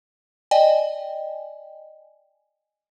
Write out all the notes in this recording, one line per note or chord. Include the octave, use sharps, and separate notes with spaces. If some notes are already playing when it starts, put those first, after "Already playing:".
D5 D#5 G5 G#5